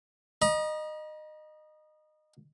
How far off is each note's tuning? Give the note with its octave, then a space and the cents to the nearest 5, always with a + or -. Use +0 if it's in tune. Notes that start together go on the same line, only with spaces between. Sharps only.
D#5 -20 A#5 +45